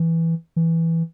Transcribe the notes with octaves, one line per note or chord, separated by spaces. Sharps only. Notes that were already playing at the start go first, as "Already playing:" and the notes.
Already playing: E3
E3